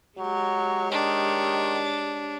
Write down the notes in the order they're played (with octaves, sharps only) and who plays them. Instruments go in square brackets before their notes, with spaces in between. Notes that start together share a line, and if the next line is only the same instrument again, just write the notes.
[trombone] F#3 [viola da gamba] G#3 G4 C#5
[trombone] D#3 [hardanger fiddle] D4